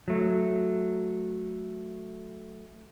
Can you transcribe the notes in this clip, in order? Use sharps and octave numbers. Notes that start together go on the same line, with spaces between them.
F#3 A3